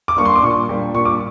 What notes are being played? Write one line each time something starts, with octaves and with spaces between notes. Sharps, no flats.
D6
G3 A#3 D4 C#6
C6
D6
A#2 C#6
G3 A#3 D4
A#2 C#6
D6